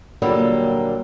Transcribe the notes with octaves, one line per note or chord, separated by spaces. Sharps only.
A#2 D3 F#3 G3 A#3 G4